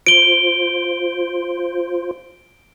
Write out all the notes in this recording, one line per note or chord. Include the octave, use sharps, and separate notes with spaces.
F4 C5 D7 G7